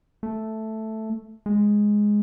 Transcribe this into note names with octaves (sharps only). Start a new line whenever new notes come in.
A3
G#3